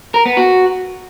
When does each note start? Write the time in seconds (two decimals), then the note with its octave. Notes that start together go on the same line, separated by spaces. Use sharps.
0.14 A#4
0.26 B3
0.37 F#4